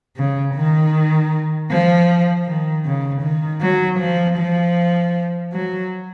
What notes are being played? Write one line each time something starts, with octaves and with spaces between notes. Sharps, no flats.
C#3
D#3
F3
D#3
C#3
D#3
F#3
F3
F3
F#3